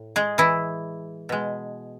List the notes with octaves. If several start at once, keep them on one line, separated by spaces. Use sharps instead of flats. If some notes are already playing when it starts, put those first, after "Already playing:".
Already playing: A2
G#3 G#4
E3 E4
B2 G#3